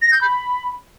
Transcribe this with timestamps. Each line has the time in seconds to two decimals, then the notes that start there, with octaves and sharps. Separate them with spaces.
0.02 A#6
0.12 G6
0.21 B5